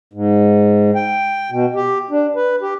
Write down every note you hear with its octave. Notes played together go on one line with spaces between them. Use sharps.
G#2
G5
B2
G4
D4
B4
G4